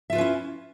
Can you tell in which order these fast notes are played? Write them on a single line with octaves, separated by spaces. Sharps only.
E5 F4 B4 C#4 E4